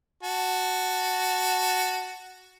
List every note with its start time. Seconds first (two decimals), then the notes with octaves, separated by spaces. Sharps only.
0.23 F#4 A5